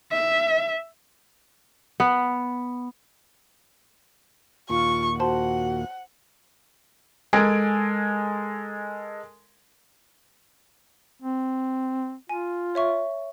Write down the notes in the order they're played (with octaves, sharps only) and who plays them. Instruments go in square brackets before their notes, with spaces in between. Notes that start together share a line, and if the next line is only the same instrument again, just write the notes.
[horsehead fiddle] E5
[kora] B3
[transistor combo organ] D#2 A#2 [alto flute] F4 [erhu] C#6
[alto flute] F#4 [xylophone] C5 A5 C6 [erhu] F#5
[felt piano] G#3 A4 A#4 G#5 D7
[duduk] C4
[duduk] F4 [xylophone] G#5
[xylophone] C#5 E5 C#6